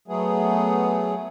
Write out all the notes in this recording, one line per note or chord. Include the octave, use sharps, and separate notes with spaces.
F#3 A3 B3 G#4